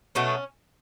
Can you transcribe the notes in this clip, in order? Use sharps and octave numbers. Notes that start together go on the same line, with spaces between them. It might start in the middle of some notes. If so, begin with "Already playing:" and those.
B2 F#3 A3 C#4